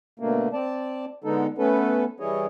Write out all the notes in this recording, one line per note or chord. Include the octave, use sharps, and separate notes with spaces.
B2 D3 A3 A#3
C4 D5 A5
D3 G#3 B3 D#4 A4
A3 B3 C#4 A4 B4
E3 G3 E4 G#4 C#5 D#5